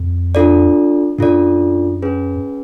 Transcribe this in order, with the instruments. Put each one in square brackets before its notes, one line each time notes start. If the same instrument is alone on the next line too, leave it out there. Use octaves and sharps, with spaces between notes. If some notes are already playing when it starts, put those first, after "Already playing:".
Already playing: [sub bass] F2
[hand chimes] D4 F4 A4 D5
[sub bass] F#2 [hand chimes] D4 F4 A4 D5
[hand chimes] C#4 G#4 B4